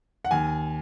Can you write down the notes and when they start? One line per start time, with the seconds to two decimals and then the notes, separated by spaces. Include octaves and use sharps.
0.25 F#5
0.31 D#2 G#5